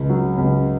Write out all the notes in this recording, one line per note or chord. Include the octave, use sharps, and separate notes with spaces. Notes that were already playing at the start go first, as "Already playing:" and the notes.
Already playing: C#2
F#3
C#2